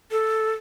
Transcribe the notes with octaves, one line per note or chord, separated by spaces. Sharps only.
A4